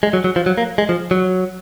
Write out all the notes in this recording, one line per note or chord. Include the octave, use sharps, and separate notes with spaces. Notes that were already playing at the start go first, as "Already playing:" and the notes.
G#3
F#3
F#3
F3
F#3
A#3
G#3
F3
F#3